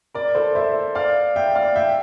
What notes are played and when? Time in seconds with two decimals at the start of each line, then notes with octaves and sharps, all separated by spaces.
0.15 A#4 D5
0.35 A4 C5
0.55 C5 E5
0.95 D5 F5
1.35 E5 G5
1.55 D5 F5
1.76 E5 G5